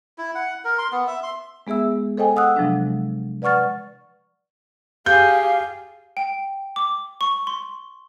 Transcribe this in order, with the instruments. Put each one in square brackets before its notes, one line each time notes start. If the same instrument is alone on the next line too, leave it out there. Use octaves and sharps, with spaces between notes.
[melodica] E4
F#5
A#4
C6
B3
E5
C6
[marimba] G#3 B3 G#4 E5 E6
A4 C5 D#5 G5 G#5
F#5 D#6 E6 F#6
C3 F3 F#3 G#3 D4
B4 D5 F#5 C#6 F6 A6
[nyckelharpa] G4 G#4 [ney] F5 [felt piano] G6
[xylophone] G5
D6
C#6
C6